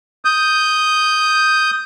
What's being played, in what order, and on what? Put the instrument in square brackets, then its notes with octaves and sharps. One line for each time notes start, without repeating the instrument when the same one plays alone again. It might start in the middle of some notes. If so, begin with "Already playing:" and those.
[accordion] D#6 G6